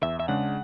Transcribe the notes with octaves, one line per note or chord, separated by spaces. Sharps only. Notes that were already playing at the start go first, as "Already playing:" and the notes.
E2 E5
E5
C#3 G#3 D4 F#5